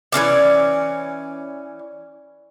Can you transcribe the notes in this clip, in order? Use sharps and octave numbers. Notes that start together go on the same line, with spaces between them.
E3 F3 C#4 D5